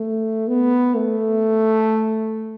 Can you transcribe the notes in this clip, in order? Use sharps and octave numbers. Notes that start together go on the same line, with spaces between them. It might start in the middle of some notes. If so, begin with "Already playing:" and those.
Already playing: A3
B3
A3